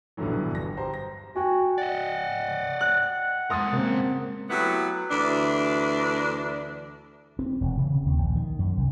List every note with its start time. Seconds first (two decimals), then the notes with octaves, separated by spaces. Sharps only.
0.17 A#1 G2 B2 D3 E3 F#3
0.53 G1 A#6
0.77 G4 C5 A#5
0.94 A#6
1.36 F#4 G5 G#5
1.78 D5 D#5 F#5
2.81 F#6
3.50 G#3 A#4 C6 D#6 A6
3.72 C#3 A#3 C4
4.50 F#3 A3 B3 E4 G4
5.11 D2 E3 D4
7.39 C4
7.61 E1
7.77 C#3
8.05 D#2
8.18 A#1
8.36 D#3
8.59 F#2
8.77 C2